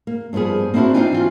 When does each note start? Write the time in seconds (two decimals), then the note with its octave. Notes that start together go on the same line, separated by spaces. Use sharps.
0.07 A#3
0.33 G2 F3 A#3 B3 G#4
0.74 A#3 C4 D4 E4 F#4 C5
0.94 C4 D4 D#4 F4 G5 G#5
1.12 E3 F4 F#4